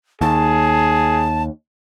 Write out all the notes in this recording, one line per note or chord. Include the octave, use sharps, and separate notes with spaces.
D#2 G#4 A5